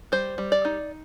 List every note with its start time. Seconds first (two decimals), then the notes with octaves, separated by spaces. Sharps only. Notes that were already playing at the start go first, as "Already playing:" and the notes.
0.12 G3 C5
0.38 G3
0.52 D5
0.65 D#4